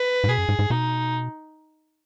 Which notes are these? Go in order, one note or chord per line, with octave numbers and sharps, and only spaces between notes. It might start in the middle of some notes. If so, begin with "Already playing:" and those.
Already playing: B4
G#2
B2 G#4
F#2
G#2
G#2
B2 D#4